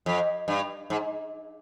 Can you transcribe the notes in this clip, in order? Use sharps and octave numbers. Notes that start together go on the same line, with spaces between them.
F2
G2
G#2